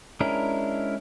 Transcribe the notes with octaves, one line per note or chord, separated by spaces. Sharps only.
G#3 C#4 D4 E4 A#4